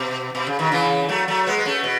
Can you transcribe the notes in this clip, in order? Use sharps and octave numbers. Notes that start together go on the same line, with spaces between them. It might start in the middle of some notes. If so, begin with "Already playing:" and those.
Already playing: B2
B2
C#3
B2 D#3
C#3 E3
F#3 A3
F#3 A3
G#3 B3
B3
A3 C#4
B2